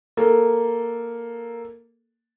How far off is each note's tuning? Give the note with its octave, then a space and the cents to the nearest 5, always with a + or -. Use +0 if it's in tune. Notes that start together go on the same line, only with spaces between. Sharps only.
A#3 +0 A4 +0